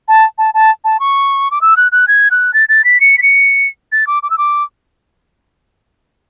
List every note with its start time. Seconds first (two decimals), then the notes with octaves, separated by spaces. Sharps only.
0.08 A5
0.38 A5
0.54 A5
0.84 A5
1.00 C#6
1.51 D6
1.61 E6
1.77 F#6
1.92 F#6
2.08 G#6
2.31 F#6
2.54 A6
2.69 A6
2.84 B6
3.00 C#7
3.18 B6
3.23 C#7
3.92 A6
4.07 D6
4.23 D6
4.30 E6
4.38 D6